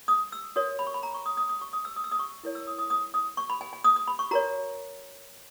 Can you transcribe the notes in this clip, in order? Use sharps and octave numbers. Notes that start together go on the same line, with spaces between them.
D#6
E6
F#4 A#4 C#5 D#6
B5
C#6
B5
A#5
C#6
D#6
D#6
D#6
C#6
D#6
E6
D#6
E6
D#6
C#6
E4 A#4 C#5
E6
D#6
D#6
D#6
D#6
C#6
B5
G#5
G#5
D#6
D#6
B5
C#6
F#4 A#4 C#5 A#5